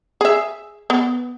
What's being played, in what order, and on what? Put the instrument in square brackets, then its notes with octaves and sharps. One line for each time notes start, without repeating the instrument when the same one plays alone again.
[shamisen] G#4 E5
B3